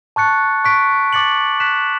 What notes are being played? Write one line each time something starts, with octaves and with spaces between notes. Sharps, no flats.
A5 C#6 F#6 A6 C#7
C#6 F#6 B6 D7
D6 A6 C#7 F#7
F#6 B6 E7